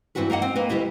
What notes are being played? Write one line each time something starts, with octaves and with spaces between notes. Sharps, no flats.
G2 E3 C4 D4 F#4 B4
A#3 D#4 D#5 F#5
C4
A#3 B4 D#5
D2 F3 G3 E4 D#5